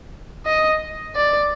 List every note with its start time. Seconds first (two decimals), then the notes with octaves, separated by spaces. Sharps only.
0.46 D#5
1.15 D5